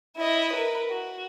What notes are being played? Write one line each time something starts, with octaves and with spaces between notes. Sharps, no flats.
E4 D#5
A#4 B4
F#4